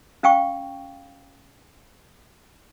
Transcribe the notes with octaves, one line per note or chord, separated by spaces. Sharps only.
C#4 F5 G5 C#6